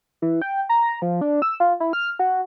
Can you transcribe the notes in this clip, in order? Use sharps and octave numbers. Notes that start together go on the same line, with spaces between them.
E3
G5
A#5
F3
D4
E6
F4
E4
F6
F#4